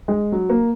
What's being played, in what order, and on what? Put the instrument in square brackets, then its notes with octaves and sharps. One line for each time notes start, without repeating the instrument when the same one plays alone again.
[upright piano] G#3
F#3
A#3